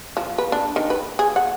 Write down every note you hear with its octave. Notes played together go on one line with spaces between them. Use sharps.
F3
B4
D4
D#3
B4
G#4
F#5